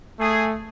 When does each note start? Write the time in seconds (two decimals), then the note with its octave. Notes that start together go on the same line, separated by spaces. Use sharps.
0.20 A3 G#4